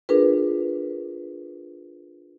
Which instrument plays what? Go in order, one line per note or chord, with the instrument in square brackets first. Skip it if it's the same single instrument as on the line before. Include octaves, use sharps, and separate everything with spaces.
[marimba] D4 F4 G#4 A#4 B4